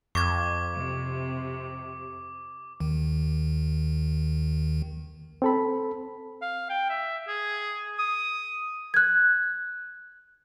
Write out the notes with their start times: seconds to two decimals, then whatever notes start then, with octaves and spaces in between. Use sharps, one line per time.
0.15 F2 C#6 D6 G#6
0.75 C3
2.80 D#2 D#3
5.42 C4 A4 B5
6.42 F5
6.70 G5
6.89 E5
7.28 G#4
7.99 D#6
8.94 F#6 G#6